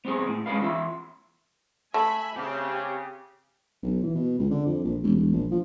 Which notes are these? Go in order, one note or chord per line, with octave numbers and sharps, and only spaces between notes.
B3 C4 G#4
A2
G#3 C#4 D4 G#4 B4 F5
E2 F4 E5
A3 E5 G#5 B5
C#3 C4 G4 A5
B1
E3
B2
C#2
D3
F2
A#1
E1
E1
A#1
F3